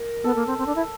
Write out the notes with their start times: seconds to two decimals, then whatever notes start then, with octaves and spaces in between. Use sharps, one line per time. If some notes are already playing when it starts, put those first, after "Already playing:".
Already playing: A#4
0.24 B3 A4
0.36 A#3
0.47 C4
0.58 C4
0.66 D4
0.76 E4